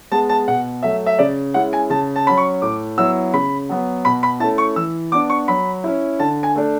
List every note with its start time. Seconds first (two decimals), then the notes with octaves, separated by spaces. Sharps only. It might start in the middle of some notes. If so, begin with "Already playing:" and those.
0.12 G#3 B3 A5
0.29 A5
0.48 B2 F#5
0.83 F#3 A3 E5
1.06 E5
1.19 C#3 D5
1.54 G#3 C#4 E4 F#5
1.73 G#5
1.90 C#3 A5
2.16 A5
2.26 F#3 C#4 B5
2.37 C#6
2.62 A2 D6
2.98 F#3 B3 E4 E6
3.33 C#3 B5
3.69 F#3 B3
4.05 B2 B5
4.23 B5
4.40 A3 C#4 E4 A5
4.58 C#6
4.76 E3 E6
5.12 B3 D4 D6
5.30 C#6
5.48 F#3 B5
5.84 C#4 E4
6.19 D3 A5
6.43 G#5
6.55 A3 D4